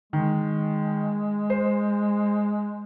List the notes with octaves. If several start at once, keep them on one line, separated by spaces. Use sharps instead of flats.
D#3 G#3
C5